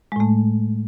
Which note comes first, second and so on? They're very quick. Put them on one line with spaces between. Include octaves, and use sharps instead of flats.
G#3 A2 A3